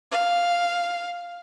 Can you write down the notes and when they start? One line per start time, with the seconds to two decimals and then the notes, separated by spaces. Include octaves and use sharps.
0.12 F5